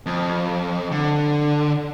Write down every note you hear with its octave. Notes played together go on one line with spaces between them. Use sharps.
F2
D3